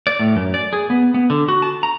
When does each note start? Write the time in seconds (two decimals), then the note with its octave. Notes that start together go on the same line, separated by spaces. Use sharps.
0.07 D5
0.19 A2
0.36 F#2
0.54 D5
0.73 G#4
0.90 B3
1.14 B3
1.30 D3
1.48 F#4
1.62 A5
1.83 A#5